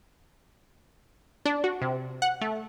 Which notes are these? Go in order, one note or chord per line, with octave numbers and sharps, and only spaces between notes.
D4
F#4
C3
F#5
A3